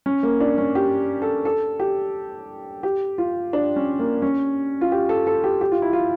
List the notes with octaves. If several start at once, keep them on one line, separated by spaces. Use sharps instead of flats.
C#4
A#3
D4
C#4
G4
A4
A4
G4
G4
F4
D4
C#4
A#3
C#4
F4
G4
A4
A4
G4
G4
F4
E4
F4